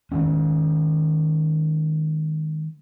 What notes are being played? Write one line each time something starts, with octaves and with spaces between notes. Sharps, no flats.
D#3 E3 G#3 C#4